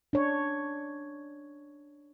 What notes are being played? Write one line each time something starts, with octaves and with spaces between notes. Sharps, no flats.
D4 C#5